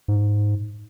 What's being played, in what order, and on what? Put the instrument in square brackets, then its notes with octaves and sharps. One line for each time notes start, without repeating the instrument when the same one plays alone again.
[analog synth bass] G#2